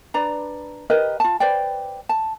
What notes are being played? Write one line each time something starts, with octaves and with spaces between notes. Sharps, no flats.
D4 B4 D5 A#5
G4 A#4 B4 D#5
F4 A5
B4 C5 D5 G5
A5